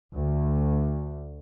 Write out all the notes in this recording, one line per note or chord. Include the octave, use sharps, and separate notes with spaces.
D2